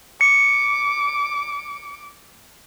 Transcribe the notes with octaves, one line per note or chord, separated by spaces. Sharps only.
D6 C#7